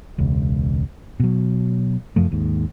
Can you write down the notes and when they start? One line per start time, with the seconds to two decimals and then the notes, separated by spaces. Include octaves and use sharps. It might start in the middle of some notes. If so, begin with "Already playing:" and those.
0.18 E1 C#2
1.20 B2 F#3
2.16 F1 F#2 F3 A3
2.32 D#2 G#2